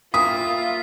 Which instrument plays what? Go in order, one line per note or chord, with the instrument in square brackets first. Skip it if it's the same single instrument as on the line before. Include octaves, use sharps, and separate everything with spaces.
[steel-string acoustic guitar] A#3 E4 [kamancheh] F4 [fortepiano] D#6 [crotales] B6